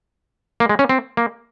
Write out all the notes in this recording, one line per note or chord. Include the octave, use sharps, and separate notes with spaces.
A#3
G#3
C#4
C4
A#3